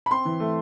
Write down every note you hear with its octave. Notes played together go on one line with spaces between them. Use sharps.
B5
C4 C6
E3
A3